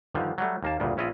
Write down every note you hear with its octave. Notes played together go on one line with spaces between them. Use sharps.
G2 D3 D#3 F3
F#3 G3 A3
D#2 A#3 A5
D2 G2 A#2 C#3
A#1 C#4 E4 F4 D#5